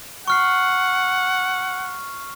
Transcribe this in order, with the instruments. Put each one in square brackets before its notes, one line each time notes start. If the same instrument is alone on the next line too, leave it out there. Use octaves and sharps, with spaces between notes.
[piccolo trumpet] F#5 [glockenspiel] C#6 F6 C7